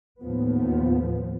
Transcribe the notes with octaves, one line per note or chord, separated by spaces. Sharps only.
D#2 A2 F3 B3